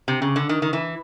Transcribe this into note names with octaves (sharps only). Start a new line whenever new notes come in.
C3
C#3
D3
D#3
D#3
E3